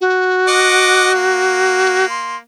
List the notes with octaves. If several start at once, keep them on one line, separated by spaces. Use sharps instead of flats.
F#4
D#5 F#5 D6
A#3
C6